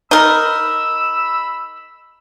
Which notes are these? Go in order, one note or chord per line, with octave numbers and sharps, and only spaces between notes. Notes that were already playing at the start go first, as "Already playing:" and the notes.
D#4 A#4 B5 E6